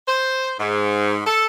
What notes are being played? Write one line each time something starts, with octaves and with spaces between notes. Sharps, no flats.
C5
G#2
A4